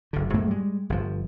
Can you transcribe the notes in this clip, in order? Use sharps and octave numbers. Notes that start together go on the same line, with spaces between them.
F#1 D3
G#2 F#3 A3 A#3
G3 G#3
G1 F3